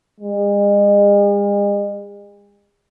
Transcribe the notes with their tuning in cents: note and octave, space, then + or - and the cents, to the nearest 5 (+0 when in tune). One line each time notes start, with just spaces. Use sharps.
G#3 -40